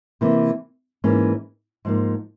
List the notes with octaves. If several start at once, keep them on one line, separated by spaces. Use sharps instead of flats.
C3 E3 A#3
G#2 E3 A#3 C#4
G#2 F3 A#3